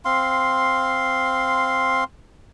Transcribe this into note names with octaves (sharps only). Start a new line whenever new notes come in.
C4 F5 C6